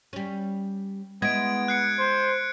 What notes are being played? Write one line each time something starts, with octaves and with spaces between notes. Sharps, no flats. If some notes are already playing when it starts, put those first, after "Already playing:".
G3 C#4
G#3 B3 E4 D#5 G#6 D7
F#6 C7 C#7
C5